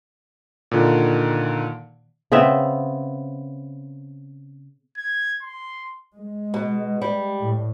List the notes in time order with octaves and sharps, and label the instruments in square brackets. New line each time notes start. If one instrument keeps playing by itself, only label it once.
[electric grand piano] A#2 D3 D#3
[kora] C#3 B3 C4 E5
[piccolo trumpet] G#6
C6
[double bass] G#3
[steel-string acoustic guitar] B2
G3
[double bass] A2